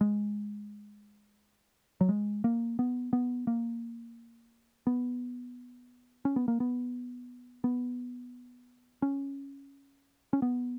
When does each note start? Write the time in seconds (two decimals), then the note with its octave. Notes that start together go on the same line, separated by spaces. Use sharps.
0.01 G#3
2.01 F#3
2.09 G#3
2.44 A#3
2.79 B3
3.13 B3
3.47 A#3
4.87 B3
6.25 C#4
6.36 B3
6.48 A#3
6.60 B3
7.64 B3
9.02 C#4
10.33 C#4
10.42 B3